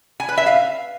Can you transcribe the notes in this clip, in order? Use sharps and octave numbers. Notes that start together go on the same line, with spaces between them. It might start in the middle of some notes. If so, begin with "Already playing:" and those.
G#5
B4
E5
F5